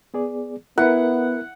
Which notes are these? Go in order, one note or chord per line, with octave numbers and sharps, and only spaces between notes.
B3 G#4 D5
B3 E4 A#4 B4 F#5